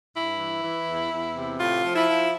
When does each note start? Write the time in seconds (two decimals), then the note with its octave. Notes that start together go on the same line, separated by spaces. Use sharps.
0.15 G2 E4
0.39 E3
0.63 E3
0.87 E2
1.12 E2
1.35 C3
1.59 A2 F4
1.84 F3
1.96 E4
2.08 F3